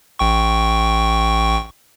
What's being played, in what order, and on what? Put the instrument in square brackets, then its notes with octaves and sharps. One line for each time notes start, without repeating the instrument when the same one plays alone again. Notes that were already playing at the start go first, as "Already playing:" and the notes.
[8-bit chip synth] A1 G5 C#6